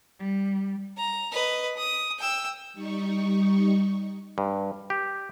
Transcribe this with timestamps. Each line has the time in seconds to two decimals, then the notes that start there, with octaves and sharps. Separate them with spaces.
0.19 G3
0.97 A#5
1.32 B4 D#5
1.77 D#6
2.19 G5 E6
2.74 G3 D#4 C#6
4.38 G2
4.90 G4